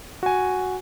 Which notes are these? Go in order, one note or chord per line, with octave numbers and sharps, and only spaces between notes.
F#4 G#5